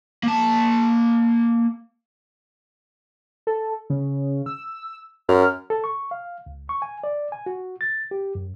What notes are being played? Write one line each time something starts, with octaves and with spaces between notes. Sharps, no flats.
A#3 A5
A4
C#3
E6
F#2 F6
A4
C#6
F5
C#2
C#6
G#5
D5
G#5
F#4
A6
G4
F#2